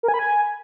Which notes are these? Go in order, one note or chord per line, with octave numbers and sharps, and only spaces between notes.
A#4
G#5
B5
G#5